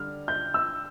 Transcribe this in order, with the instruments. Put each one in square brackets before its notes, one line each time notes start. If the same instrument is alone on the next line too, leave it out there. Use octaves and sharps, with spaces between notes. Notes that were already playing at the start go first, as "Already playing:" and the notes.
Already playing: [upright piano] D3 G3 F6
G6
E6